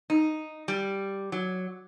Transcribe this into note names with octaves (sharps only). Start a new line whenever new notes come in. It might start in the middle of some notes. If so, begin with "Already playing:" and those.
D#4
G3
F#3